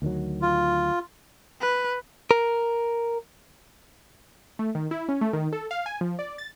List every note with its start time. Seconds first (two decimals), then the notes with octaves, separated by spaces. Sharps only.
0.02 D2 D#3 F#3
0.42 F4
1.61 B4
2.31 A#4
4.59 A3
4.75 D#3
4.91 E4
5.08 C#4
5.21 A3
5.33 D#3
5.52 A4
5.71 F5
5.86 G#5
6.01 F3
6.19 D5
6.38 A6